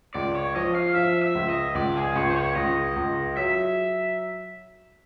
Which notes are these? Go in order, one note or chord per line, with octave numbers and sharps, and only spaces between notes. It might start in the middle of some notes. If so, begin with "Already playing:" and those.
C#2 D5
C#5
F3 D#5
F5
F3 E5
E5
C#2
D#5
C#2 D5
G#4
C#2 C#5
C5
C#5
C#2 D#5
C#2
F#3 E5